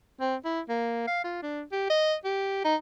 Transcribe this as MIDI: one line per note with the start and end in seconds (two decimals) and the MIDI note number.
0.20 0.36 60
0.45 0.61 64
0.69 1.05 58
1.07 1.24 77
1.24 1.39 65
1.42 1.62 62
1.72 1.88 67
1.90 2.15 75
2.25 2.60 67
2.65 2.75 63